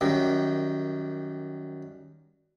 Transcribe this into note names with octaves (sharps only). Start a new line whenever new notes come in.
F#2 D#3 G3